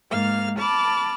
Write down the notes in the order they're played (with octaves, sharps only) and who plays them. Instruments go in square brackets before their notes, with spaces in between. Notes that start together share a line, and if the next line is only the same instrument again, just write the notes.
[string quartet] G#2 A#3 F5 F6
A5 B5 D6 F6